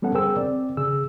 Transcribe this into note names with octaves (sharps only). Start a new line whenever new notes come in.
G3 B3 C#4 A4 F#5
G#4 A#4 C5 G5 E6
C4 D5
C#3 G#4 E6